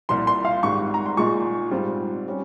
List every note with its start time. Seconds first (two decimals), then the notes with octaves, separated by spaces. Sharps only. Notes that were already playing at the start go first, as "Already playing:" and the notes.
0.09 C2 A#2 F3 C6
0.27 C6
0.45 F5
0.63 G#1 G#2 G3 C#6
0.94 A#5
1.06 C6
1.17 A#2 G#3 D#4 C#6
1.71 G#2 G3 C4 F4
2.28 G3 C#4